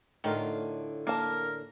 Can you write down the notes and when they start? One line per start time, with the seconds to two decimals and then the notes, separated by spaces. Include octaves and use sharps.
0.24 A2 D3 D#3 F#3 A3 F4
1.07 A#3 A#4 A5